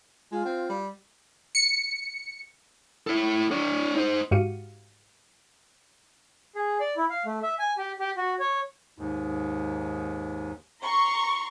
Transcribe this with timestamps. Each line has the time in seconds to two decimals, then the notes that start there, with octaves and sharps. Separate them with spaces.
0.32 G#3 F4
0.45 C4
0.70 G3
1.55 C#7
3.07 E4 A4
3.51 D4 C#5
3.96 D#4 C5
4.31 G#2 F#4 G4 F5 C#7 D#7
6.55 G#4
6.80 D5
6.97 E4
7.10 F5
7.25 A3
7.43 E5
7.59 G#5
7.78 G4
8.00 G4
8.17 F#4
8.40 C#5
8.98 D#2 G#2
10.83 A#5 C6 C#6